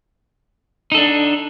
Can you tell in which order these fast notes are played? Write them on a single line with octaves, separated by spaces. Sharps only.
D#4 A4 D4